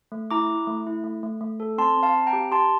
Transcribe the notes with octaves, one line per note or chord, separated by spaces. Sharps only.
A3
E4 A#5 D6
E4
A3
E4
A3
A3
A3
A4
C4 A5 C6
C4
F5 A5
C4
G5 A#5
G4
G4 A5 C6